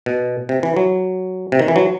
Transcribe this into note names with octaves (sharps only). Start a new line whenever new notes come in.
B2
C3
E3
F#3
C3
D#3
E3
F#3